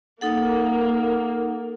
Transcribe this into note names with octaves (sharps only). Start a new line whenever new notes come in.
A#3 D#4 A4 F#5